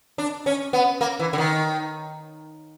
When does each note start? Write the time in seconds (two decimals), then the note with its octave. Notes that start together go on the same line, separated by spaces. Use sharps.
0.18 D4
0.46 C#4
0.73 B3
1.01 A#3
1.19 E3
1.33 D3
1.38 D#3